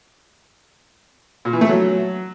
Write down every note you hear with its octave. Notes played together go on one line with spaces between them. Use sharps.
A#2
E3
A3
F#3